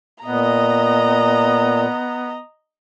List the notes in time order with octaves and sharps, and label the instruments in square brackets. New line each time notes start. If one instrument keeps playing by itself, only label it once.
[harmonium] A#2 [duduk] B3 [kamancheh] D#5 A#5